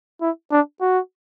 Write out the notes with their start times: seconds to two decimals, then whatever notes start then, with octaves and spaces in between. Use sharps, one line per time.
0.22 E4
0.51 D4
0.81 F#4